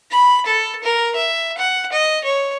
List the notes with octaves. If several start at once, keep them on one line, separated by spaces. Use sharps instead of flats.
B5
A4
A#4
E5
F#5
D#5
C#5